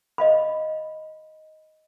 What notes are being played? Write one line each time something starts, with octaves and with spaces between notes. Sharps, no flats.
D#5 F5 B5